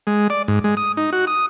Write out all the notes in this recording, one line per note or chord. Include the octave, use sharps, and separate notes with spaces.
G#3
D5
G#2
G#3
D#6
D#4
F#4
D#6